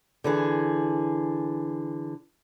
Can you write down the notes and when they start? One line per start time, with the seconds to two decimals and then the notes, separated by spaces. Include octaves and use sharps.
0.24 D3 E3 G#4